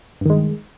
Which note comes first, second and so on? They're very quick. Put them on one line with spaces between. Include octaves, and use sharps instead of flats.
G2 D#3 G#3